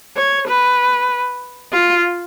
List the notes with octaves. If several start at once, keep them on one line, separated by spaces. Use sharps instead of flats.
C#5
B4
F4